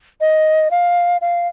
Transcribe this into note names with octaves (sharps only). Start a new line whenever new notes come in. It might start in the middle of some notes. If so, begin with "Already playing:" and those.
D#5
F5
F5